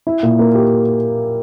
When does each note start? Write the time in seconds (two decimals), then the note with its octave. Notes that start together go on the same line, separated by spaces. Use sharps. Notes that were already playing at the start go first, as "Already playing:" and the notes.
0.07 E4
0.23 A#2
0.39 A#3
0.55 G4